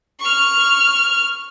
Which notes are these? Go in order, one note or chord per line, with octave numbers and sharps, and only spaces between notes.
C#6 F6